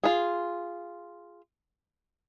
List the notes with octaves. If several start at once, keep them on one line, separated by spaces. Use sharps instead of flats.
F4 G#4